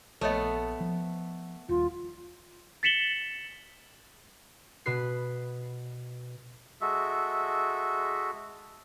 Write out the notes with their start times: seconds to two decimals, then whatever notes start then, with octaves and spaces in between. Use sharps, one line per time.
0.21 A#1 A3 B3 A4 C#5 D#5
0.80 F3
1.69 D#1 F4
2.83 A6 B6 C#7 E7 F#7 G7
4.86 B2 B4 C7
6.81 G#3 F#4 A4 E5